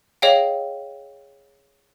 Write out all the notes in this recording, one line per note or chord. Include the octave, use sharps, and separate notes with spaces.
G#4 C#5 D#5 F5 G5